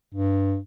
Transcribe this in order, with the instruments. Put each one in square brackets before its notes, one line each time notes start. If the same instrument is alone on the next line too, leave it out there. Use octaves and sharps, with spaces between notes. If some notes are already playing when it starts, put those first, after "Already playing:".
[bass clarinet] G2